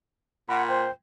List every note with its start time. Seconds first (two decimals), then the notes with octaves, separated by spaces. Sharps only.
0.49 A#2 F#5 B5
0.69 C5 G5